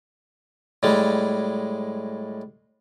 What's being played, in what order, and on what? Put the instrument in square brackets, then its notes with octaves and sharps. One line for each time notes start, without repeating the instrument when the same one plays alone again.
[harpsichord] A2 G3 G#3